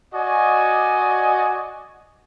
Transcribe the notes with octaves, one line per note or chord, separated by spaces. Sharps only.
F#4 D5 D#5 G#5